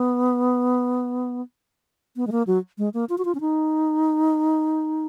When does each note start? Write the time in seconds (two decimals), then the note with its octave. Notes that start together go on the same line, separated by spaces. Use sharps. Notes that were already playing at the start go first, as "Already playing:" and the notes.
Already playing: B3
2.16 B3
2.27 G#3
2.32 A#3
2.47 F#3
2.78 G#3
2.94 A#3
3.09 F4
3.18 F#4
3.25 F4
3.35 C#4
3.41 D#4